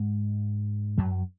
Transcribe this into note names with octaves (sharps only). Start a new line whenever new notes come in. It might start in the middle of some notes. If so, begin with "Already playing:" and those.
Already playing: G#2 G#3
F#2 F#3